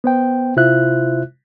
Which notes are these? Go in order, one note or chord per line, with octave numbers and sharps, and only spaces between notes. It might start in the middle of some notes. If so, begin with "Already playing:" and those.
B3 C5 G5
C3 E4 F4 C5 E5 F#6